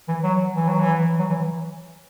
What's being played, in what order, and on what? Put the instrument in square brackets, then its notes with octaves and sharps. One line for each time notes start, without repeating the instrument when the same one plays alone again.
[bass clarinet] E3
F#3
E3
F#3
E3
F#3
E3